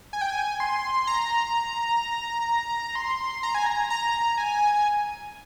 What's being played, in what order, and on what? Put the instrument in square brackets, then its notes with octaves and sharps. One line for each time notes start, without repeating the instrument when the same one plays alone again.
[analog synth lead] G#5
G5
G#5
C6
A#5
C6
A#5
G#5
A#5
A#5
G#5